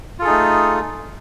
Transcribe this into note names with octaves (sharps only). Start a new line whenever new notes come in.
A3 D#4 F4 G#4 A4